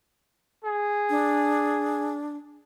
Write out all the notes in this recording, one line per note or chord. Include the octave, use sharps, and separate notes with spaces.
G#4
D4